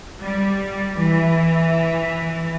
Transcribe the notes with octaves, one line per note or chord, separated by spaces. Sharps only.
G3
E3